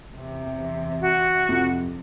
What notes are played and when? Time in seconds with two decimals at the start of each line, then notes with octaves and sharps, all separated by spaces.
0.13 E2 C3
1.01 F#4
1.49 F2 C3 F3